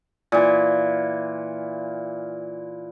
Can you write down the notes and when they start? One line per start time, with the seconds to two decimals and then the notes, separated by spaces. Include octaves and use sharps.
0.32 A#2 E3